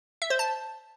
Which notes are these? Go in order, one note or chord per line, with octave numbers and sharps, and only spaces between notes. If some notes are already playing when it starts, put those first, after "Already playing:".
E5
C5
A5